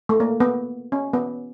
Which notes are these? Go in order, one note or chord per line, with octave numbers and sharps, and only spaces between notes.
A3
A#3
B3
C#4
B3